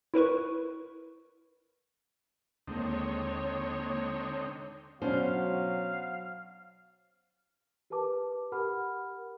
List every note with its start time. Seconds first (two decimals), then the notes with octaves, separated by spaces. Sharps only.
0.14 E4 A#4 B4 C#6
2.67 D#2 D3 G#3 A#3 C4 D#4 C#5
5.02 B2 F#3 C#4 D4 C5 F5
7.90 G4 A#4 B4 A5 D6
8.52 G4 A#4 F#5 B5 F6